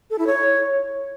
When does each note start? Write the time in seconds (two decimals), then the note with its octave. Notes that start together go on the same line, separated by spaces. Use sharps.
0.10 A4
0.19 E4
0.27 C#5